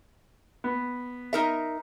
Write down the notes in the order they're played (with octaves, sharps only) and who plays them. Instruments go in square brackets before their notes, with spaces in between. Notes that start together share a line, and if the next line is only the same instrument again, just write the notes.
[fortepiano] B3
[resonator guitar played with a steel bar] D#4 A#4 E5